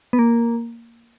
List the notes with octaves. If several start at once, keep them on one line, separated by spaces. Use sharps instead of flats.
B3
A#3